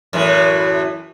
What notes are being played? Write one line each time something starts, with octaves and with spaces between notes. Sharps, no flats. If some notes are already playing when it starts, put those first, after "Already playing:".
F#2 A2 E3